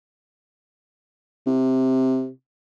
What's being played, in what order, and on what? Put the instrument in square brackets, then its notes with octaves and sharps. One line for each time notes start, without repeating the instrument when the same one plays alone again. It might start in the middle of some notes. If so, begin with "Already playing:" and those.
[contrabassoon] C3